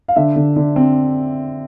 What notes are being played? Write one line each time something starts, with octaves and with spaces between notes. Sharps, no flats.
F5
D3 E5
D3
D3
C4